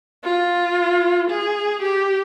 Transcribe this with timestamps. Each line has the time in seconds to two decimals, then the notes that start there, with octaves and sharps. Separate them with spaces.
0.24 F4
1.31 G#4
1.83 G4